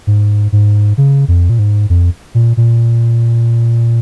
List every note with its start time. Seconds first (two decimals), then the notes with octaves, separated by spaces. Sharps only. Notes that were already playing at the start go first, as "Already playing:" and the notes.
0.07 G#2
0.52 G#2
0.98 C#3
1.28 F2
1.50 A#2
1.59 G#2
1.90 F2
2.35 A#2
2.57 A#2